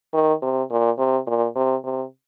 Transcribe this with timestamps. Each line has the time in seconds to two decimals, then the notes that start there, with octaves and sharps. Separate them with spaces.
0.13 D#3
0.42 C3
0.71 A#2
0.98 C3
1.27 A#2
1.55 C3
1.84 C3